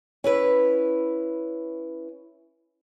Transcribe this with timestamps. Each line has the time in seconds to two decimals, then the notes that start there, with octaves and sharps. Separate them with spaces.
0.24 C#4 E4 B4